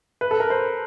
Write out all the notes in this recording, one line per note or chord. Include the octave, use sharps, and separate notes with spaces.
B4
A4
A#4
C5